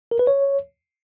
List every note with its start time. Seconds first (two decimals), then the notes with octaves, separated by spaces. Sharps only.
0.11 A#4
0.19 B4
0.27 C#5